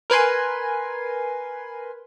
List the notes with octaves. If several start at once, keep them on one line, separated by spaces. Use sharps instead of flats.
A#4 B4 G#5 C6